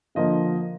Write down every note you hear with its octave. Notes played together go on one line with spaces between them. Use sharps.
D3 F3 A#3 D#5